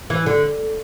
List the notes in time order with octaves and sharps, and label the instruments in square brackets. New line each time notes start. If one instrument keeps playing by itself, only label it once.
[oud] E3
D3